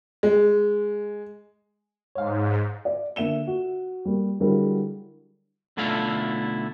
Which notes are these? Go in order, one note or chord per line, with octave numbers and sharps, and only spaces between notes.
G#3
G#2 C#5 F5
D5
D3 A#3 E5 E7 G7
F#4
G3 A#3
D3 F#3 G3 E4 G#4 A#4
B1 D3 A3 E4 F4 F5